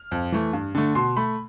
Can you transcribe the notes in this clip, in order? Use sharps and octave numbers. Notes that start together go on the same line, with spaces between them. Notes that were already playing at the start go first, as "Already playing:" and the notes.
Already playing: F6
F2
E3 A3
G2
D3 A3
B2 C6
A3 B5